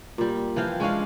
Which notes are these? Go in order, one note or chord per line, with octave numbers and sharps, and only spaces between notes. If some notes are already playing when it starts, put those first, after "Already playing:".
A#2 G3
E3 F3 F5 G5
G#3 C#4 D4 F5